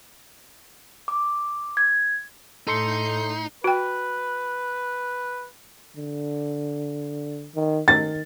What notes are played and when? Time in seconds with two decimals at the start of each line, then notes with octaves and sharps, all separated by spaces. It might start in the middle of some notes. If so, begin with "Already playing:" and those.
1.08 D6
1.77 G#6
2.67 A2 D#4 A4 C6 G6 C7 C#7
3.64 F#4 B4 G5
5.96 D3
7.55 D#3
7.88 D#3 A6